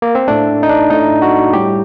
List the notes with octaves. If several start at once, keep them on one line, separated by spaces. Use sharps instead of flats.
A#3
C4
A2 A3 D4
D#4
D4
A2 A3 D#4
F#4
A2 G3 G4